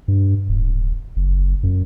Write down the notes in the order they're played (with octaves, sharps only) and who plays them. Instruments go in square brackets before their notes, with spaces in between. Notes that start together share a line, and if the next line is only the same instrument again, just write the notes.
[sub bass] G2
D1
F#1
F#2